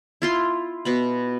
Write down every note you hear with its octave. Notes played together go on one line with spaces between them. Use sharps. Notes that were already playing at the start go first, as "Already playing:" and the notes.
E4 F4 C6
B2 B3 B5